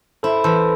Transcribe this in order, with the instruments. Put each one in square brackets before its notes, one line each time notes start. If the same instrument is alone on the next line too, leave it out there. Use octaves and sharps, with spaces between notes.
[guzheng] E4 [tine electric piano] A4 C5
[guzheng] E3 [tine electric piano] A4 C5